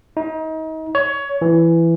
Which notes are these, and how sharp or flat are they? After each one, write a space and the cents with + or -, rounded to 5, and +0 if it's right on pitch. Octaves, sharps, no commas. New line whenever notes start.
D#4 +30
C#5 +20
E3 +15